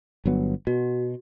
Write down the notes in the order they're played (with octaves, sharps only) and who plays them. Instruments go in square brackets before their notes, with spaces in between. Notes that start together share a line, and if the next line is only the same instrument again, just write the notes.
[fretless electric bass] G1 F#3 B3
[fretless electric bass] B2 [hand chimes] F#4